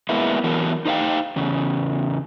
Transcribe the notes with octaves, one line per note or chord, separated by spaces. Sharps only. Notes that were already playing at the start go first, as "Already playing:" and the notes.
G#3 A#3 B3 E4
E3 F#3 B3 A#4
D#4 C5 D5 F5 G5
E2 C#3